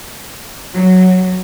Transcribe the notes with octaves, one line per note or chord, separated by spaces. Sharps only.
F#3